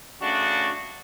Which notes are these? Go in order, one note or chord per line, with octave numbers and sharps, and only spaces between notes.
C#3 A3 D4 F#4